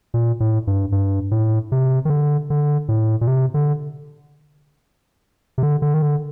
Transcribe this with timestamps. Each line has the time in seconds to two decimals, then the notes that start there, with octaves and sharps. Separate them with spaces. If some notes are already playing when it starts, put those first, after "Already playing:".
0.14 A#2
0.40 A2
0.67 G2
0.92 G2
1.31 A2
1.72 C3
2.05 D#3
2.10 D3
2.50 D3
2.88 A2
3.21 A#2
3.27 C3
3.54 D3
5.58 C3
5.63 D3
5.82 D3
5.94 D#3
6.02 D3